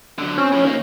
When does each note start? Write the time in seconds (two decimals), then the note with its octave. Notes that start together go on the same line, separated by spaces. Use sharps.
0.19 D3 F#3
0.38 C4 C#4
0.52 A2 F3
0.64 D#3 A#3